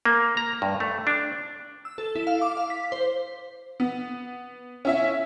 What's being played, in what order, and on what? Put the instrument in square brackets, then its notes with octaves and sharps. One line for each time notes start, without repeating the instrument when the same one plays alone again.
[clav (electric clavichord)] A#3
A#5
G2
A3
D4
[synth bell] E6
A4
E4
F5
D6
F5
B6
C5
[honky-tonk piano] B3
C#4 E4 E5